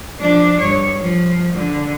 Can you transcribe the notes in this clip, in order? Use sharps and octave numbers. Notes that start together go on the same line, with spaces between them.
F3 D4
G2 C#5
F3
D3